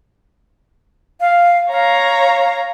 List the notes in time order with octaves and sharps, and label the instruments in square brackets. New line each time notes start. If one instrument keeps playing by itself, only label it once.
[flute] F5
[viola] C#5 A#5 [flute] F5